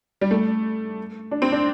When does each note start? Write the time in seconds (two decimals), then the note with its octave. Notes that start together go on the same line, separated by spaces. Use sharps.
0.21 G3
0.31 A3
1.31 D4
1.42 C4
1.52 D4